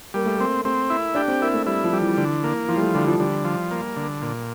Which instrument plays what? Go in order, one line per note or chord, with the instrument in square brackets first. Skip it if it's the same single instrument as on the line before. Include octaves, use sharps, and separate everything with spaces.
[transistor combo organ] G3 [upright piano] A#3
[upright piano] A3
[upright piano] A#3 [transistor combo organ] C4
[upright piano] A3 [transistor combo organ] C4
[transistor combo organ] E4
[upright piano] D4 [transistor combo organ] G4
[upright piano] C4
[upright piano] A#3 [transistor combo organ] E4
[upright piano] A3
[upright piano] G3 [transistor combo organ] E4
[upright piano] F3
[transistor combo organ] G3
[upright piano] E3
[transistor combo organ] D3
A#3
[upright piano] E3 [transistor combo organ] F3
[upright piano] G3
A3
[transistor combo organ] D3 [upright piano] G3
[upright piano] F3
[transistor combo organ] D3 [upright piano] G3
[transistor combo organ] F3
A#3
D3
A#2